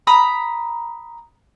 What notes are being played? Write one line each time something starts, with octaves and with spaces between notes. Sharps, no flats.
A#5 B5 D#6